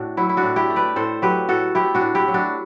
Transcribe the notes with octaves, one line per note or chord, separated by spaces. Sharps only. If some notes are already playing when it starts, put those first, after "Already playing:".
Already playing: A2 A3 D4 F#4
F#3 E4
E4
D4 F#4
A2
E4 G4
A3
B4 D5
A2 A4 C5
F#3 G4 B4
A2 F#4 A4
A3 E4 G4
D4 F#4
A2
E4 G4
F#3
D4 F#4